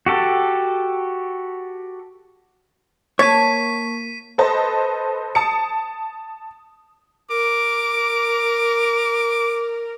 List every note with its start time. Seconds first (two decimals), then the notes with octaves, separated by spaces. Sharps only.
0.06 F#4 G4 A4
3.19 A#3 C#5 A5 B6 D#7
4.38 A4 B4 C5 D#5 A5
5.35 A5 D#6 C#7
7.30 A#4 D6